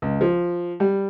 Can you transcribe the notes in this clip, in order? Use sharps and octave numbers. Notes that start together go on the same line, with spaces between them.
C#2
F3
G3